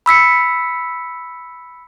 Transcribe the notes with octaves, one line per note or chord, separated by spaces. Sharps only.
B5 E6 B6 C#7